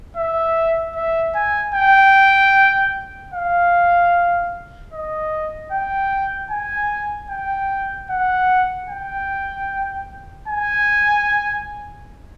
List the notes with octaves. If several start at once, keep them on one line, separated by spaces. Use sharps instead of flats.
E5
E5
G#5
G5
F5
D#5
G5
G#5
G5
F#5
G5
G#5